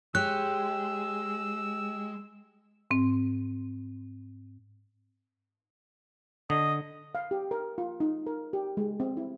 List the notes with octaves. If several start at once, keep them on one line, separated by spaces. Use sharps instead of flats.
G#3 G4 C#5 E6 F#6
G#2 C4
D3 D#5
F5
G4
A#4
F4
D#4
A#4
G4
G#3
C4
E4